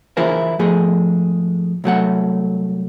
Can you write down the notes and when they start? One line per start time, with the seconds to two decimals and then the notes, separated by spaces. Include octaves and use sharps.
0.17 E3 E4 F4 G#4 A#4 C5
0.59 G#2 F3 G#3 A3 G#4
1.84 C2 F#3 A3 F#5